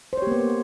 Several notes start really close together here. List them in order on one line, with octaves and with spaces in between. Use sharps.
C5 C#5 G4 A#3 B3